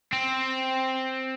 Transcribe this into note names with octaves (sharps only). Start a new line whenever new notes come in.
C4